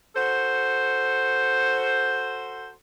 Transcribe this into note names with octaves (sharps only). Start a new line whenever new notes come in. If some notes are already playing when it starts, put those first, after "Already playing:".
F#4 A4 C5